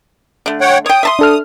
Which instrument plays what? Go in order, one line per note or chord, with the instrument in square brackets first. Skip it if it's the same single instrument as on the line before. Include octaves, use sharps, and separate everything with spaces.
[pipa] D3 A3
[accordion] C#5 F#5 G5
[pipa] C#5 G5 [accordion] D#6
[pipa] E5 A5 C6
[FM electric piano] D4 A4 F6